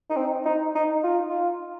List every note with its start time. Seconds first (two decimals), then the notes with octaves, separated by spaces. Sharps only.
0.10 D#4
0.16 C4
0.46 D#4
0.75 D#4
1.04 F4
1.30 F4